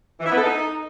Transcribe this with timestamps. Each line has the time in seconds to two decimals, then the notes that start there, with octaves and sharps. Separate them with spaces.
0.20 E3
0.26 E4
0.32 B3
0.37 A4
0.43 D#4